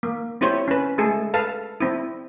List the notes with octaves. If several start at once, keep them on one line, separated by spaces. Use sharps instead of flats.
A#3
C4 E4 G4 C5 C#5
C#4 B4
G#3 A3 G#4 A4
A4 B4 F5 A5
C4 E4